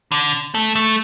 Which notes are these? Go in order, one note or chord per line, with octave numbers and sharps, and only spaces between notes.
D3
A3
A3